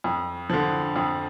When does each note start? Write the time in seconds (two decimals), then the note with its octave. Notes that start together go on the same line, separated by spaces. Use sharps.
0.04 F2
0.50 D3 F3
0.96 F2